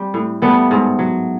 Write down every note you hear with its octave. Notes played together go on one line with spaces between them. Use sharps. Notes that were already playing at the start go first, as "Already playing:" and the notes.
Already playing: G3 C4
A2
G3 A3 B3
G#2
F#3